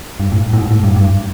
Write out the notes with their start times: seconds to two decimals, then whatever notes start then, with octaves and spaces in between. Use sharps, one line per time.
0.20 G2
0.32 A2
0.53 A2
0.58 G#2
0.71 A2
0.84 G2
0.96 G2